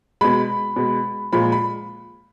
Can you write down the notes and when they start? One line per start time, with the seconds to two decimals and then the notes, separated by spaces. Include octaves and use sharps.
0.21 B2 G#3 B5
0.76 B2 G#3
1.32 A#2 F3 G#3 B5
1.52 B5